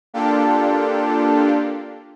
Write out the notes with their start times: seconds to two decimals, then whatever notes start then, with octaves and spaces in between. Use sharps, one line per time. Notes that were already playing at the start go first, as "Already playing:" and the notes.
0.14 A#3 D4 F4 G4 A4